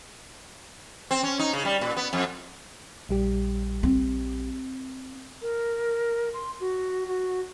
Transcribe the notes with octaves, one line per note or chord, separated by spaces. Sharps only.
C4
C#4
D#4
C#3
G3
A#2
B3
F2
A#1 G3 G4
C4
A#4
C6
F#4
F#4